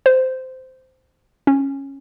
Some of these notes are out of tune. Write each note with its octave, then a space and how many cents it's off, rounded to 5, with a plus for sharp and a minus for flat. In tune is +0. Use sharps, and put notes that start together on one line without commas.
C5 -15
C#4 -10